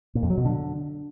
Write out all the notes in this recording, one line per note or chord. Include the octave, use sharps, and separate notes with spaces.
A#2
F2
F#3
B2
D3